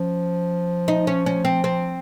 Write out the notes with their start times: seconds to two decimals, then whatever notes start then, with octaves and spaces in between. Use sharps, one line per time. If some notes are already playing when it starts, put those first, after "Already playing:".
Already playing: F3 C#4
0.88 D#4
1.07 C#4
1.26 C#4
1.45 C4
1.64 C4